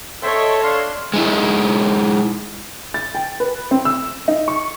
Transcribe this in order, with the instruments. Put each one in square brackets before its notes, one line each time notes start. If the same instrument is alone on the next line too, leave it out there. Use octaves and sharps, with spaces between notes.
[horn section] A4 [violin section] C#5 D#5 [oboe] E5 [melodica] G5 C6
[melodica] D4 C6 [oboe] F5
[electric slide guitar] G#3 D#4 E4
[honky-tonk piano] A6
G5
B4
C4
E6
D#4
C#6